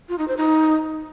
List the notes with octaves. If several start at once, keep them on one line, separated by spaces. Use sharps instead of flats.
F4
D#4
C5
D#4